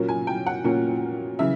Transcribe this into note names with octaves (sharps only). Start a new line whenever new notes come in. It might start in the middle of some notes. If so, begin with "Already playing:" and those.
Already playing: A#2 F#3 A#3 C#4
G#5
G5
F#5
A#2 F#3 A#3 C#4
C#3 E3 E5